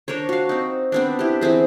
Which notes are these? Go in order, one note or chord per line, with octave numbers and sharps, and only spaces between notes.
D4 A#4 C5 C#5
F#4 F5
C4 D#4
B3 C4 D4
E4 G4
E3 B3 C4 G#4